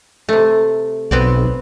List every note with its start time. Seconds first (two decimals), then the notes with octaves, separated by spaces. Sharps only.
0.29 C3 A3
1.11 B1 B3 C4 D5